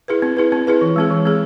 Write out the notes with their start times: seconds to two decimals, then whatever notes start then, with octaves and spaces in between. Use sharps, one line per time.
0.08 E4 G#4 B4
0.22 C4
0.37 E4 G#4 B4
0.52 C4
0.67 E4 G#4 B4
0.81 E3
0.96 G#3 C4 G#4
1.10 E3
1.25 G#3 C4 G#4